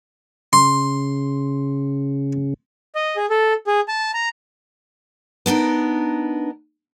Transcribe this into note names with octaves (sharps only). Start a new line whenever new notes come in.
C#3 C6
D#5
G#4
A4
G#4
A5
A#5
B3 D4 D#4 A#4